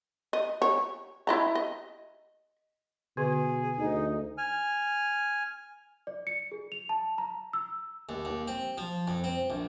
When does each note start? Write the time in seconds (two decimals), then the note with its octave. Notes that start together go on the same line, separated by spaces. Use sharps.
0.33 D#5
0.62 C#5
1.27 E4 D#5 A#5
1.55 D#5
3.17 B2 D3 G#4
3.77 D2 D#4
4.38 G#5 F6
6.07 D5
6.27 C#7
6.52 G#4
6.72 F7
6.89 A5
7.18 A#5
7.53 E6
8.09 D#2
8.25 D#2
8.48 C4
8.78 F3
9.07 F2
9.24 C4
9.50 A#1